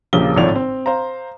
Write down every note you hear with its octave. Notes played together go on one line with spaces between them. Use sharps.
A#1 C#3 F3 A#3 G4 G7
G#1 A2 F3 C#5 D5 F7
C4
C5 F5 A#5